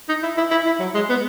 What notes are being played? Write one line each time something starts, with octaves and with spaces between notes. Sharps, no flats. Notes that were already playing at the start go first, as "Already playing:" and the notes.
D#4
E4
E4
E4
E4
F#3
G#3
B3